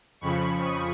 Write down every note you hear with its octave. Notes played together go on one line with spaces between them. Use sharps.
F2 C#3 F3 B5 C#6
C#6 D#6